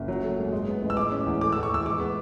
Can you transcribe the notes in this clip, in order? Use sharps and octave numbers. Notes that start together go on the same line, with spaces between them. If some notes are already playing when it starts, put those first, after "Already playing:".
Already playing: F#1
F#3
A3
G#1
G#3
B3
A1
E6
G#3 D6
C#4
E2
A3 D6
E2 E6
C#6
E2 E6
G#3 D6
B3